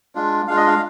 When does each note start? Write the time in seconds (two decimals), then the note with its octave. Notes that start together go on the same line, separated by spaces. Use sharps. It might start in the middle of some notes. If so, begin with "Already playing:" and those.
0.15 G#3 D4 F4
0.48 G#3 D4 F4 F5
0.57 D#5
0.67 F5